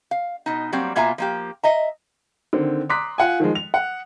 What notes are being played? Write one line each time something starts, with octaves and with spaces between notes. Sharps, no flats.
F5
B2 D#4
F#3 G3 A#3 C4
B2 A#3 F4 E5 G#5 A#5
F3 A#3 G4
D#5 E5 A#5
D3 D#3 C4
A#5 C6 D6 D#6 F#6 B6
F4 F#5 G#5
D#3 F3 G#3
F7
F#5